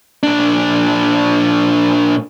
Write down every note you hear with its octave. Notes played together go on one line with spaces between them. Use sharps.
A#2 D4